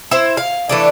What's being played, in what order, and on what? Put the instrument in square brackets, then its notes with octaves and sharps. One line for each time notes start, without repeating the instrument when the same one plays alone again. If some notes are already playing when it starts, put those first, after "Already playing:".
[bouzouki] E4 C5
F5
E3 A3 D4